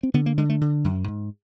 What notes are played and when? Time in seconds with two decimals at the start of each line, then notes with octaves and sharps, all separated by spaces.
0.03 C4
0.14 D3 B3
0.26 A#3
0.38 D3 G#3
0.49 A3
0.61 D3
0.84 F#2
1.08 G#2